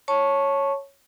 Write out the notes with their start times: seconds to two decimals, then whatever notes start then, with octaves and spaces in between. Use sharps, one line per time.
0.08 C#5 A5 C#6